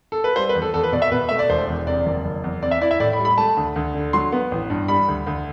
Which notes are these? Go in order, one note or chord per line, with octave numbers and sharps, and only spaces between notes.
A4
B4
G3 C5
B4
E2
A4
E2 A4
B4
B2 D5
E5
B2 B4
A3 E5
D5
E1 C5
E2
C3 D5
F#1
F#1
E2
C4 D5
E5
E4 D5
E5
A2 D5
B5
G3
B5
A3 A5
D2
D2
D3
F#3 C6
B3
A1
G2
G3 B5
D2
D2